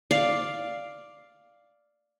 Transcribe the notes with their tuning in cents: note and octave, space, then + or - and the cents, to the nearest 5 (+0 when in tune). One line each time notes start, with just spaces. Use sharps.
D5 +0 F5 +0